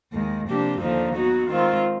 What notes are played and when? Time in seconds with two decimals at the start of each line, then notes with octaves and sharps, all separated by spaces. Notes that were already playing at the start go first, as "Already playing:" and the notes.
0.13 D#2 D#3 G#3
0.47 C3 F3 A#3 D4 G4
0.81 D#2 D3 F3 A#3 D#4
1.15 F#3 B3 D#4 F#4
1.49 D#3 G#3 C4 F4